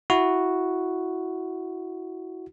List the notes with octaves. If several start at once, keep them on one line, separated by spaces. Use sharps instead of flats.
E4 F#4